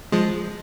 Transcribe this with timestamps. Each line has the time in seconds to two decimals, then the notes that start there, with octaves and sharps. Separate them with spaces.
0.12 F3 G#3